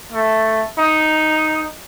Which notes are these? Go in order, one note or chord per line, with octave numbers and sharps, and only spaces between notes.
A3
D#4